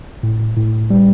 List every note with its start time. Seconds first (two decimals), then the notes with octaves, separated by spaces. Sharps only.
0.23 A2
0.57 A2
0.90 G3